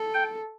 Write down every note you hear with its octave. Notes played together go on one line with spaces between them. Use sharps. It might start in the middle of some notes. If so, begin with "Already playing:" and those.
Already playing: A4
G5